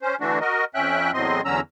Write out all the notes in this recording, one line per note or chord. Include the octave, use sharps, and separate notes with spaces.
C#4 C5
D3 E3 A3 D4 F#4
F#4 A#4 D#5
F2 C#4 E5 G5 F#6
E2 A2 F#3 C4 D#5 C6
E2 D3 F#3 C#4 A#5 E6